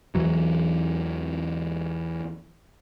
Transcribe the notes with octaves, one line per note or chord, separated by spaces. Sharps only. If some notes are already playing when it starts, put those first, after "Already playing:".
E2 E3 F#3